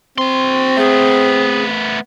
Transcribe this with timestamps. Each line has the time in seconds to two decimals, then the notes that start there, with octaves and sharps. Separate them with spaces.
0.18 C4 F#4 C6
0.77 A3 B3 G#4